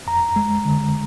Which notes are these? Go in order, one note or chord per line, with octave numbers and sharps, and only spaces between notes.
F2 A#5
G#3
D3